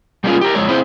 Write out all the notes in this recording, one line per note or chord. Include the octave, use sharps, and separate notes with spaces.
G3 G#3 A#3 C#4 F4 G#4
G4 A#4
F2 G#3 C#5
C4 E4 G#4 C5